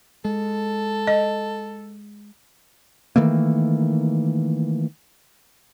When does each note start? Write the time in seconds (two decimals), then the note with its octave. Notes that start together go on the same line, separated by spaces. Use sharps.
0.25 G#3 A4
1.07 D#5
3.16 D#3 E3 A3 A#3